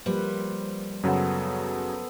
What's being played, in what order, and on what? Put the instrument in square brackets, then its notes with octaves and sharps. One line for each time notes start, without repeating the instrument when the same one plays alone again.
[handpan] F3 A#3 B4 [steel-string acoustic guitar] G3 [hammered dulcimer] C5
[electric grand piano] F#2 C#3 F#3 [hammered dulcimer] B3 A4 C5